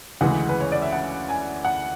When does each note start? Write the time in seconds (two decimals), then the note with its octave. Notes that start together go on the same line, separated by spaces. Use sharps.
0.21 D2 C#3 E3 G#3 F#5
0.49 B4
0.60 C#5
0.72 D5
0.82 E5
0.92 F#5
1.29 G#5
1.65 F#5